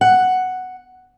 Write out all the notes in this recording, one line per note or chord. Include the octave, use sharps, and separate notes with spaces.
F#5